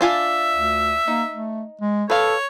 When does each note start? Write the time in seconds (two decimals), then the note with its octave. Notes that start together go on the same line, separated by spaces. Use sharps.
0.01 D4 F4 E5 G#5
0.53 D2
1.08 A#3 D#4
1.30 A3
1.82 G#3
2.10 A4 B4 C#5 F5